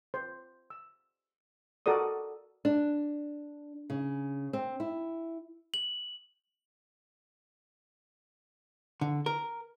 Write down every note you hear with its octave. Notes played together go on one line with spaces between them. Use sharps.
C5
E6
F#4 A4 A#4 D5 D#6
D4
C#3
C4
E4
F#7
D3
A#4